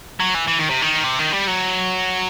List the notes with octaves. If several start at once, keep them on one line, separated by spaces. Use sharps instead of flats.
F#3
E3
E3
D#3
C3
D#3
C3
D#3
G3
F#3